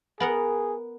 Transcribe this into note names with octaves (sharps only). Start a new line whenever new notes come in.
B3 G#4 A#4 F#5